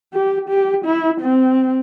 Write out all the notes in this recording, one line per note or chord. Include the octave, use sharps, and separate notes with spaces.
G4
G4
E4
C4